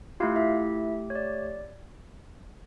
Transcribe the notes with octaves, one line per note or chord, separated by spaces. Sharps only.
A3 E4 F4 G4 F5
E4 E5
C#5
D5